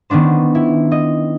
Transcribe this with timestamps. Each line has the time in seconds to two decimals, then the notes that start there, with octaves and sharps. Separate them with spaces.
0.10 D#3 B3 C#4 D4 C5
0.55 E4
0.92 D#5